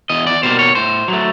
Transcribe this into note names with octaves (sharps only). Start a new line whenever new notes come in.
E2 D#5
D5
B2 G3 A#3 C5
C#5
A2 C5
F#3 A3